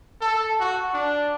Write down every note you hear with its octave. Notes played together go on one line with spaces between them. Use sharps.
A4
F#4
D4